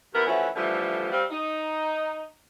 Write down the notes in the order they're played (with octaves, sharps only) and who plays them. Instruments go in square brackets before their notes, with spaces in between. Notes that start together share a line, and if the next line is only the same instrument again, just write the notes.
[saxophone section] D#2 B3 E4 A#4
E3 F3 A3 C#4 E4 F#4
D3 E3 F3 G3 A3
G3 C4 F5
D#4